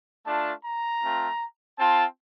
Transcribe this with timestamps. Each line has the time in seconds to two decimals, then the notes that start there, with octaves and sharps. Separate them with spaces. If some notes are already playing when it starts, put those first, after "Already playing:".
0.25 A3 D4 F4 A5
0.63 A#5
1.02 A3 C4 F4
1.78 C4 F4 A5